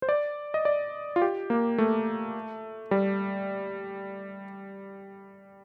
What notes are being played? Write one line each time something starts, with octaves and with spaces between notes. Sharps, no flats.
C5
D5
D#5
D5
F4
G4
A#3
A3
G3